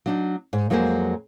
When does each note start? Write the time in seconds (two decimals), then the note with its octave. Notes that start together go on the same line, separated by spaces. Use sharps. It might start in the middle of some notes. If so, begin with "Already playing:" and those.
0.06 F#3 D4 D#4
0.53 G#2
0.70 F2 F#3 G#3 A#3 G#4 C5